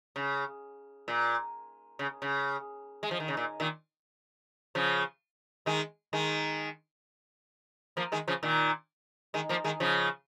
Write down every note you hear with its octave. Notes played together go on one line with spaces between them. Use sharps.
C#3
A#2
C#3
C#3
G#3
F3
D#3
C#3
A#2
A#2 D#3
C#3 F3
D#3 G#3
D#3 G#3
F3 A#3
D#3 G#3
C#3 F3
A#2 D#3
D#3 G#3
F3 A#3
D#3 G#3
C#3 F3